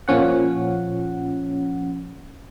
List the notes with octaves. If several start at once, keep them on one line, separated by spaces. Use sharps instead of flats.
A#2 F3 C#4 F#5